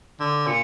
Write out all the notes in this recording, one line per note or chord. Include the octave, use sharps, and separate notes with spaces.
D3
A#2